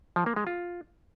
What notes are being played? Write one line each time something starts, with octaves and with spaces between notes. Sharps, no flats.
F3
A#3
G#3
F4